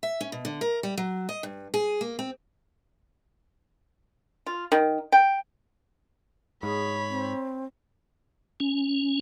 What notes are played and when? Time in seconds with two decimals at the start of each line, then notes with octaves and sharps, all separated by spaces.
0.03 E5
0.21 C#4
0.32 B2
0.45 D3
0.61 A#4
0.83 G3
0.98 F#3
1.29 D#5
1.43 G2
1.74 G#4
2.01 A#3
2.19 C4
4.46 F4
4.72 D#3
5.12 G5
6.63 G#2 G#4 C#5 B5
7.10 C4
8.60 C#4